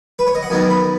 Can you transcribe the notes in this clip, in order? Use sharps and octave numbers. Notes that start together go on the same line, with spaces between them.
B4
C#5
D#5
F#5
F#2 D#3 B3 D#4 G#5
B5